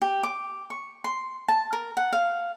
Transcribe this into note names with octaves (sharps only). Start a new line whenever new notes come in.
G4
D6
C#6
C6
A5
A#4
F#5
F5